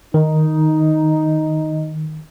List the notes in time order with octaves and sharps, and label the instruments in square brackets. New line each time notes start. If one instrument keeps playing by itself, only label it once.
[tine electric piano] D#3 [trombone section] D#4